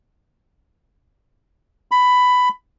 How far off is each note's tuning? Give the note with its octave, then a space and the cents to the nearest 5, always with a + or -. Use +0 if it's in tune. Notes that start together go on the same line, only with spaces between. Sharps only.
B5 +10